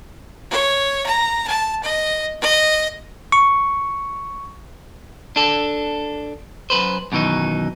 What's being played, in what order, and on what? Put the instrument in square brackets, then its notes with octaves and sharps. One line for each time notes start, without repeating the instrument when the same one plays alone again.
[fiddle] C#5
A#5
A5
D#5
D#5
[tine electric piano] C#6
[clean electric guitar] D4 A4
F#2 A#2 B4 C5
F#2 B2 D#3 E3 D#4